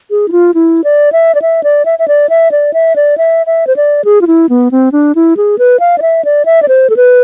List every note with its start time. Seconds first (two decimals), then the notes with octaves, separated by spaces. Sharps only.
0.11 G#4
0.28 E4
0.32 F4
0.54 E4
0.84 D5
1.12 E5
1.35 D5
1.42 E5
1.63 D5
1.85 E5
1.99 E5
2.08 D5
2.29 E5
2.51 D5
2.74 E5
2.96 D5
3.18 E5
3.46 E5
3.67 C5
3.76 D5
4.05 G#4
4.21 F4
4.27 E4
4.49 B3
4.71 C4
4.92 D4
5.15 E4
5.37 G#4
5.59 B4
5.80 F5
5.98 D5
6.02 E5
6.25 D5
6.45 E5
6.62 D5
6.68 C5
6.90 A4
6.97 B4